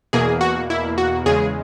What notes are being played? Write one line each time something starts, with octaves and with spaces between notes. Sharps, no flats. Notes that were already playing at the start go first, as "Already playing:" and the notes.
E2 B2 A#3 G#4
F#4
E4
F#4
E2 C#3 G#3 G#4